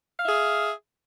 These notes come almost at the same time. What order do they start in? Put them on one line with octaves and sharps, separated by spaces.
F5 E5 G#4